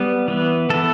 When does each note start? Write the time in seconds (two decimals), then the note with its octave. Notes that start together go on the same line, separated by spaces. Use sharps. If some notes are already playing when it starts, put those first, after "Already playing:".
Already playing: G3 B3
0.28 E3 B3
0.69 E3 B3 A4